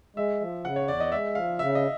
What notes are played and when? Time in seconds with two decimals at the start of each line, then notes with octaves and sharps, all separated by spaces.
0.16 G#3 E5
0.41 F3
0.64 C#3 F#5
0.76 C#5
0.88 E2 D5
1.00 D#5
1.12 G#3 E5
1.35 F3 F5
1.59 C#3 E5
1.75 D#5